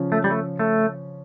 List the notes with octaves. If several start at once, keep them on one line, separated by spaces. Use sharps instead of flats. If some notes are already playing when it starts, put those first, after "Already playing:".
Already playing: C#3 F3 C#4
A3
G3
A3
A3